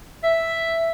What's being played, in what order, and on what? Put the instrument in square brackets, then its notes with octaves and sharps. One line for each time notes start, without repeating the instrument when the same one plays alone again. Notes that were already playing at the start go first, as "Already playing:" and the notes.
[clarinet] E5